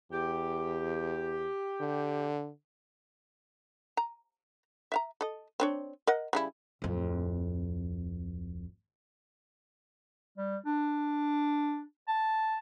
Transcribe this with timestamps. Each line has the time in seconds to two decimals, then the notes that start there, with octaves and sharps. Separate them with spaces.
0.12 E2 G4
1.80 D3
3.97 A#5
4.92 E5 F5 A#5
5.21 A4 D#5
5.60 C4 D4 C#5
6.07 A#4 D#5 F#5
6.33 C#3 G3 E4
6.82 D1 F2
10.38 G3
10.66 D4
12.08 A5